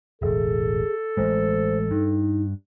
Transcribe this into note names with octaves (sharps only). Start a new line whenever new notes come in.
E1 A1 G#4 A4
A1 G#3 C5
G2 D#4